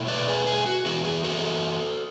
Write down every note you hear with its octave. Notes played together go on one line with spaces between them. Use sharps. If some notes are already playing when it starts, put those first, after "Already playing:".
Already playing: B2 A3 E4
B4 D5
G#4 B4
G#4
F#4
E3 B3 E4 F#4
G#4
F#4 A4